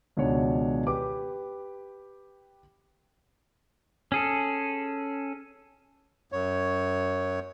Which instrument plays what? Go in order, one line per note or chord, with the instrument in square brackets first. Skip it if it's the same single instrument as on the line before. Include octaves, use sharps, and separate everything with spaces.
[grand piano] C#2 B2 D#3 D4 C#5
G4 B4 D6
[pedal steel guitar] C#4 G#4 A4
[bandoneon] F#2 C#5